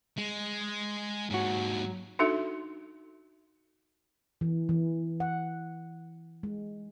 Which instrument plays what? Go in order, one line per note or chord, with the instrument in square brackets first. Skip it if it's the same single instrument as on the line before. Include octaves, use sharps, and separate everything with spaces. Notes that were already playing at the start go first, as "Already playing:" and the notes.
[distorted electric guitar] G#3
[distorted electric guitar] D#2 F#3 [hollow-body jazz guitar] G#2 F#4
[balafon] D4 D#4 F#4 A4 E5
[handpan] E3
E3
F#5
G#3